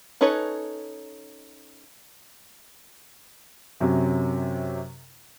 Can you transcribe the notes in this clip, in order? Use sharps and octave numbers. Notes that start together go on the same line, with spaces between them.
C#4 D#4 A4 B4 C#5
F#2 C3 F#3